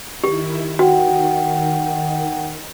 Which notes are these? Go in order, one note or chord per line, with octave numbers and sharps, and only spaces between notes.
D#3 E4 G4
D#3 F#4 F#5 G5